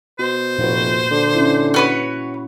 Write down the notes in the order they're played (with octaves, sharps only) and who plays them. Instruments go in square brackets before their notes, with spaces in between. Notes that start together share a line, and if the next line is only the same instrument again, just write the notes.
[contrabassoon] B2 [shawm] C5
[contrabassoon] F1 [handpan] A#2 F#4 B4
[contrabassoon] D3
[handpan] C#4 E4
[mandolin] F#4 B4 C#5